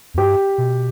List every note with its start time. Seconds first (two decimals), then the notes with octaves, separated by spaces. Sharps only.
0.14 E2
0.18 G2 G4
0.58 B2